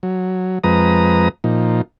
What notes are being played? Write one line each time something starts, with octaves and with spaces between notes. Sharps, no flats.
F#3
F2 F3 G#3 B4 A#5 D#6
A#2 F3 D#4